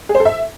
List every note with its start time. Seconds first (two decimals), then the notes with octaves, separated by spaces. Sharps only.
0.09 G#4
0.15 C5
0.20 A4
0.25 E5